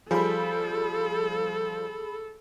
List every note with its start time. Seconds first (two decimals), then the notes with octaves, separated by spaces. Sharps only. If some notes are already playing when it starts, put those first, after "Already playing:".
0.11 F3 G3 G#4 A4 B5